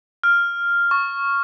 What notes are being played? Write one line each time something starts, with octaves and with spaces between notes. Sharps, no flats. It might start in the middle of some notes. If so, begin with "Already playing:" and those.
F6
C#6